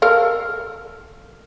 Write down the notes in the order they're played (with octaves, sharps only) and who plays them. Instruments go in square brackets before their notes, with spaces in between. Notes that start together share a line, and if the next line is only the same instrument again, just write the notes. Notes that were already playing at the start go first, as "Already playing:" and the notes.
[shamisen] A4 A#4 F5